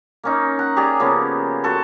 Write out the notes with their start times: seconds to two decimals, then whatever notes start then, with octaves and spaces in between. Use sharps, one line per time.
0.24 A#3 C#4 D#4
0.59 F#5 A#5
0.76 G4 G#4 D5 A#5
1.00 C#3 F3 A#3 B3
1.64 F#4 A4 C6